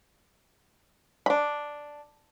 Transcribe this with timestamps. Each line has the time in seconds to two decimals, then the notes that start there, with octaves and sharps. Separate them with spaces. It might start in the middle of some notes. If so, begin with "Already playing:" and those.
1.26 D4 B5